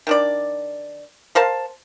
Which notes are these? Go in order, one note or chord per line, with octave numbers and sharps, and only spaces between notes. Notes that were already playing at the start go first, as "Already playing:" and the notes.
D#3 D4 D5
A#4 C5 F5 A5